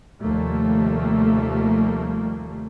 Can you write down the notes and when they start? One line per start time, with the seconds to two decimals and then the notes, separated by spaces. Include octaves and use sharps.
0.21 D#2 C3 F3 G3 A3 A#3